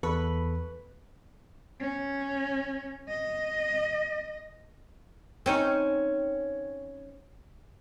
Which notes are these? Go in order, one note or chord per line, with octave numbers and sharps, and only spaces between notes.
E2 A4 B4 C#6
C#4
D#5
C4 C#4 D#4